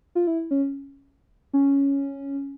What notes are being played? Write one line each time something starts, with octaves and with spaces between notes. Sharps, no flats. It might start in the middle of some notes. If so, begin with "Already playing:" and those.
F4
E4
C#4
C#4